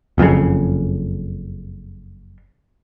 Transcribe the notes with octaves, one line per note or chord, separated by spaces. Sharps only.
F#1 F2 A#2 C#3